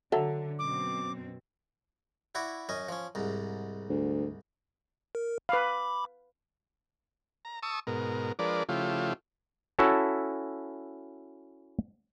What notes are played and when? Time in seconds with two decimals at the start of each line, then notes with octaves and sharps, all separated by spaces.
0.12 D3 F#3 A4 E5
0.59 F#2 B2 C4 D6
2.35 E4 F#4 D5
2.69 F#2 C#4 D#5
2.89 F3 C#4
3.15 C2 G#2
3.90 D2
5.15 A#4
5.49 B4 F5 B5 D6
7.45 A#5
7.63 A5 C#6 D#6 E6
7.87 G#2 B2 A#4
8.39 F3 G#3 D4 A#4 B4 D5
8.69 C#3 F3 A3 E4 F4 G4
9.79 C#4 E4 F#4 A4 E5 A5